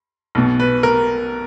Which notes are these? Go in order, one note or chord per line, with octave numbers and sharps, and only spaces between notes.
B1 B2
B4
A#4